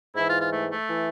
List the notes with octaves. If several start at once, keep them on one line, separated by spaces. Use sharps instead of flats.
G#2 E3 E4
F4
F4
A3
A3
E3